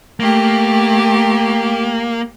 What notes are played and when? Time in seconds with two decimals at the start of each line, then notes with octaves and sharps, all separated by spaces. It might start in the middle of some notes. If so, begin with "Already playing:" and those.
0.20 A3 A#3 G4